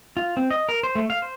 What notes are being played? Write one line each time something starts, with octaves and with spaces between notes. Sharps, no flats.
F4
C4
D#5
A#4
C5
A3
F5
C5